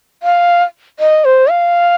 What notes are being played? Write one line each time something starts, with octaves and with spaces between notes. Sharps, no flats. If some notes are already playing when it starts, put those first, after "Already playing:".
F5
D#5
C5
F5